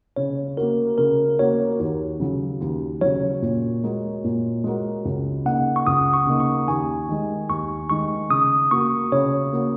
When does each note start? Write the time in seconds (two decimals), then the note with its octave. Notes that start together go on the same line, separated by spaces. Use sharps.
0.16 C#3 C#5
0.57 A#3 F#4 A#4
0.98 C#3 A#4
1.39 A#3 F#4 C#5
1.80 D#2
2.20 C#3 F#3
2.61 D#2
3.01 C#3 F#3 C#5
3.42 A#2
3.83 G#3 F#4 A#4
4.24 A#2
4.64 G#3 F#4 A#4
5.05 C#2
5.45 C#3 A#3 D#4 F#5
5.76 C#6
5.87 C#2 D#6
6.13 C#6
6.27 C#3 A#3 D#4
6.40 C#6
6.68 D#2 G#5
7.09 D#3 G#3
7.49 D#2 C#6
7.90 D#3 G#3 C#6
8.30 C#3 D#6
8.71 A#3 F#4 A#4 C#6
9.12 C#3 C#5
9.53 A#3 F#4 A#4